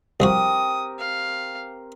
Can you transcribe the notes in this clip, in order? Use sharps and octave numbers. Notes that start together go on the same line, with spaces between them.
C2 F3 C4 F#4 G4 A#4 D#6
F5